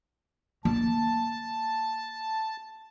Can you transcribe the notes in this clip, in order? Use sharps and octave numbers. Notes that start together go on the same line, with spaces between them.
A#3 A5